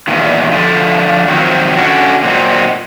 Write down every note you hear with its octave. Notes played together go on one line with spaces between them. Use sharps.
E2 A#2 D#3
D3 F3 A3
D#3 F3 F#3 C4
D3 C#4 D4 F#4
A#2 F#3 G#3 C4 D#4